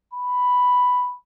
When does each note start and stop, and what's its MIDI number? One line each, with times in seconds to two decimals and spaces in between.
0.13 1.15 83